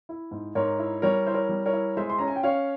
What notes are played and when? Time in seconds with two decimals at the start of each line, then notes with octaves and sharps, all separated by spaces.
0.09 E4
0.31 G#2
0.55 G#2 A#4 C#5
0.79 E4
1.02 G3 A#4 C#5
1.26 E4 C5
1.34 A#4 C#5
1.49 G3
1.66 A#4 C#5
1.73 E4
1.97 G#3 C5 E5
2.10 C6
2.19 C#4 A#5
2.28 G#5
2.36 G5
2.43 C#4 C#5 F5